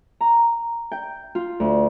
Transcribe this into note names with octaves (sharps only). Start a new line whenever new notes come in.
A#5
G5
F4
D2